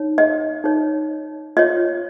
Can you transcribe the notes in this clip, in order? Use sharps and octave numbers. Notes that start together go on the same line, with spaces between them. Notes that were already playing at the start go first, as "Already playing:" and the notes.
Already playing: D#4 C#5
D#5
D#4 C#5
F4 C#5 D#5